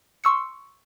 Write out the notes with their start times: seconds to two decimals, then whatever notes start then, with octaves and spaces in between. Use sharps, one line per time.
0.24 C6 C#6 E6 C#7